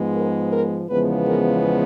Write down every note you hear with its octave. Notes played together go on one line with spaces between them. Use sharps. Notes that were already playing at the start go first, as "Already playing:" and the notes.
Already playing: G#2 F3 G#3 B3
A#4
A#4
E2 C#3 F3 G#3 B3 B4
A#4